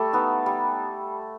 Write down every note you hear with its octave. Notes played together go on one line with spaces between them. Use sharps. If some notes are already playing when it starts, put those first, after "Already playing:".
Already playing: G3 A3 A4
B3 D#4
G3